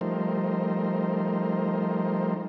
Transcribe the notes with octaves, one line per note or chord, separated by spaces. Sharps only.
F3 G3 A3 D#4 A#4 C5